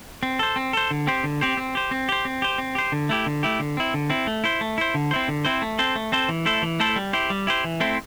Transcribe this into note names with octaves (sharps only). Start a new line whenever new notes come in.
C4
A4 C5
C4
A4 C5
D3
C4 G4 C5
D3
C4 G4 C5
C4
G4 C5
C4
G4 C5
C4
G4 C5
C4
G4 C5
D3
A3 E4 G4
D3
A3 E4 G4
D3
C4 E4
D3
C4 E4
A3
E4 C5
A3
E4 C5
D3
C4 E4 C5
D3
C4 E4 C5
A3
C4 A4 C5
A3
C4 A4 C5
E3
A3 E4 A4 C5
E3
A3 E4 A4 C5
G3
E4 G4 C5
G3
E4 G4 C5
E3
A3 C4 E4 C5